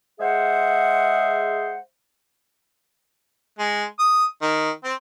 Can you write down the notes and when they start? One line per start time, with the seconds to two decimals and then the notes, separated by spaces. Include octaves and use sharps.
0.20 G#3 G#4 C5 E5 F#5
3.59 G#3
3.99 D#6
4.42 D#3
4.84 C4